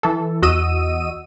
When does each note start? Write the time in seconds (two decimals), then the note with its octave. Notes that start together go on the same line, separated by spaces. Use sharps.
0.03 E3 A4
0.42 E2 F#4 D#5 E6 D#7